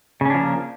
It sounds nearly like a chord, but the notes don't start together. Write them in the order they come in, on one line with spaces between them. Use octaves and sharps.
C#3 C#4 D4 F3 A#3